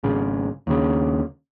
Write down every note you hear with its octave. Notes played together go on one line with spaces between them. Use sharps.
G#1 C#3
D#2 C#3